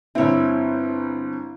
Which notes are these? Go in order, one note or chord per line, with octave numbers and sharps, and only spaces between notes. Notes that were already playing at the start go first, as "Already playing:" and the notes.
G1 C4 E4 C#5